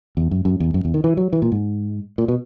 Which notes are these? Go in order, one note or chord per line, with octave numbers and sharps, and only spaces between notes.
E2
F#2
F#2
E2
F#2
E2
D#3
E3
F#3
E3
A#2
G#2
A#2
B2